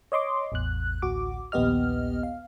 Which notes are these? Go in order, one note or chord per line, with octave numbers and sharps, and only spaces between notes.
C#5 D#5 C6 D6
A1 E2 F#6
A1 D2 F#4 D6
A#1 D#2 B3 G4 D#5 F6
F5